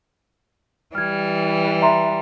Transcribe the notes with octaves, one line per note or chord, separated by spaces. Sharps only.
E3 G3 F6 G#6
E5 A#5 C6